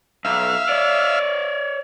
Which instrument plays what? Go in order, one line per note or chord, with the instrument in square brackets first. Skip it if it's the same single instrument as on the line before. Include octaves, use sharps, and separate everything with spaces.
[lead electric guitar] B1 [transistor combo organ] E5 F5
[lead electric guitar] C#5 D5